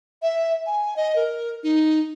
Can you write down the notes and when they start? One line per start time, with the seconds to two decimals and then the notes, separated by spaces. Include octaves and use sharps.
0.22 E5
0.66 G#5
0.96 D#5
1.16 A#4
1.63 D#4